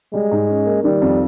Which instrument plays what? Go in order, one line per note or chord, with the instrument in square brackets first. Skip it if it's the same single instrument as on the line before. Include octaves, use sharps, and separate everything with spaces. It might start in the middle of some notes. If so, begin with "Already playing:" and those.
[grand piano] G3 [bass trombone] G#3
[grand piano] G#2
C#4
A#3
[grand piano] D#3 [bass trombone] G3
[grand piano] F2